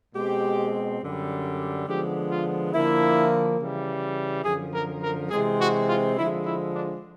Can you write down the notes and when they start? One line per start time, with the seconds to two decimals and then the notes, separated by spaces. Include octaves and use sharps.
0.15 B2 G#3 C4 G4
1.01 F#2 D3 G3
1.87 D3 F3 G#3 B3 G4
2.30 F4
2.73 D3 F3 A#3 E4
3.59 C#3 E3 G3
4.44 F#2 D3 F3 G#4
4.73 A#4
5.02 A#4
5.30 C3 E3 G#3 C4 G#4
5.59 F#4
5.87 F4
6.16 D3 F3 G#3 E4
6.45 E4
6.73 D4